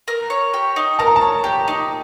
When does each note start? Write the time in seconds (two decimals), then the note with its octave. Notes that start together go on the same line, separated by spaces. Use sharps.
0.08 A#4
0.30 C#5
0.54 G4
0.76 D#4
0.99 A#4 A5
1.07 A#5
1.16 A5
1.21 C#5
1.44 G4
1.68 D#4